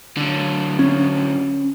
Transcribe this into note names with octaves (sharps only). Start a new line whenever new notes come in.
D3 F#3
C#4